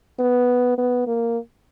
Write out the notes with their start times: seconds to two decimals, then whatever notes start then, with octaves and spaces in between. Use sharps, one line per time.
0.19 B3
0.78 B3
1.07 A#3